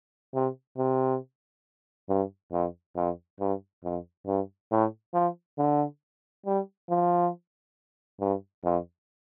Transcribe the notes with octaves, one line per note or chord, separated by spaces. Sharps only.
C3
C3
G2
F2
F2
G2
F2
G2
A2
F3
D3
G3
F3
G2
F2